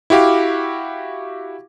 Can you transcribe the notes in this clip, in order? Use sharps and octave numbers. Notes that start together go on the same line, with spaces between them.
E4 F#4 G4 F5 D6